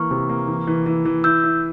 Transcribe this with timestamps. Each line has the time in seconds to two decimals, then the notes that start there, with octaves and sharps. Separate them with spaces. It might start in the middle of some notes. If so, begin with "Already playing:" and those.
Already playing: E3 A#3 C#6 F6
0.11 C3
0.29 A#3
0.48 E3
0.67 E3
0.86 E3
1.05 E3
1.24 E4 E6 G6
1.44 E4